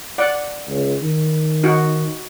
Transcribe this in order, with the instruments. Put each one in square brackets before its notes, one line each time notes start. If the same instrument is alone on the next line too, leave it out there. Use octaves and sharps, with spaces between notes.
[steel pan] D5 F#5
[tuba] C#2
D#3
[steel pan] D#4 F#4